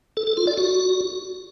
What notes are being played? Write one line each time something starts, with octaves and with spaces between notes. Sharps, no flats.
A4
A4
F4
D5
F#4